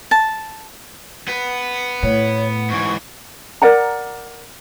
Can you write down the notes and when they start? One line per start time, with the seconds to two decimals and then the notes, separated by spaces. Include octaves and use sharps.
0.11 A5
1.28 B3 B4
2.03 A2 C#5
2.70 G#2 E3 C#6
3.62 A#4 D5 F#5 A#5